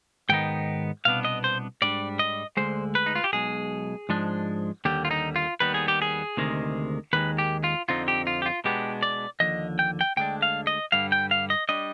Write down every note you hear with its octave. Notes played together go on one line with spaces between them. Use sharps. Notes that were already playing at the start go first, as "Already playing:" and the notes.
G#2 D#3 B3 D#4 G5
C2 B2 B3 D4 F5
D#5
C5
G#2 G3 D4 D5
D#5
D2 D3 G#3 C5
B4
D#4
F4
G4
B1 B2 G#3 G#4
G#2 F3 G#3 D4
D#2 D3 G3 G4
F4
D#4
F4
D#2 D#3 G3 B3 B4
G#4
G4
G#4
D2 C3 D#3 G#3
D#2 D#3 G#3 B4
G4
F4
F2 D3 F3 C4 D#4 F4
G4
F4
G4
F4
B2 G#3 B3 D4 G4
D5
D#2 D3 F3 D#5
G5
G5
D2 D3 G#3 D4 G5
F5
D#5
G2 D3 G3 F5
G5
F5
D#5
G3 D4 D#5